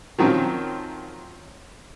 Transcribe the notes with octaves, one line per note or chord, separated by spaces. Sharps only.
D#3 F3 F#3 C4 C#4